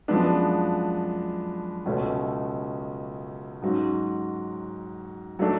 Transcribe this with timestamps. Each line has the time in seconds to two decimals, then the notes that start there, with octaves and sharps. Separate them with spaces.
0.08 F#2 F3 G#3 B3 D4
1.86 C#2 B2 A3 C#4
3.62 G#2 F#3 C#4 F#4
5.39 F#3 A3 D4